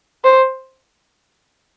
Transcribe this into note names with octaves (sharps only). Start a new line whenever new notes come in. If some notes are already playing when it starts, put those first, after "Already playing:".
C5